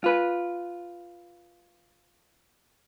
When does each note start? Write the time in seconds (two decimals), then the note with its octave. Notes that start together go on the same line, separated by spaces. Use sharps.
0.04 F4 B4